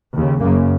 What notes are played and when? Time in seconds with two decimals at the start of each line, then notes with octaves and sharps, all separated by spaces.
0.13 D#2 C#3
0.41 F#2 C#3 A#3